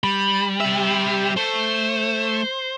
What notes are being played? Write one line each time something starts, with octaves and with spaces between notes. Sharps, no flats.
G3 B5
G4 E5
A3 C5